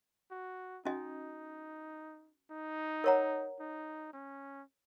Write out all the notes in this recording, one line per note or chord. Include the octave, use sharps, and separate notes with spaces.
F#4
C#4 D#4 F#4 D#5 G#5
D#4
A#4 C#5 F#5 A#5
D#4
C#4